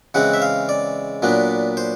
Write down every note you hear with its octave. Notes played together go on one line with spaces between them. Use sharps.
C#3 E3 G#3 C4 F#5
E5
F5
D5
A#2 F#3 B3 D4
C5